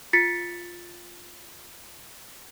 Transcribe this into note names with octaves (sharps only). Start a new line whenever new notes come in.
F4 A6 B6 C#7